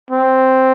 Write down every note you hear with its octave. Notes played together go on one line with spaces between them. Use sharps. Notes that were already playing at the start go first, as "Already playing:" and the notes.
C4